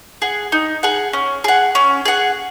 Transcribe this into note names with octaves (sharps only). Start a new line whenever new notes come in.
G#4 F#5
D#4
G#4 F#5
C#4
G#4 F#5
C#4
G#4 F#5